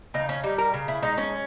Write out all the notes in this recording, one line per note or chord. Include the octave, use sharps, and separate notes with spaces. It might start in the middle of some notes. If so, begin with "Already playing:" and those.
C#3 D#4
C#4
G3 D#4
A#4
C#3
E4
G#3 D#4
C#4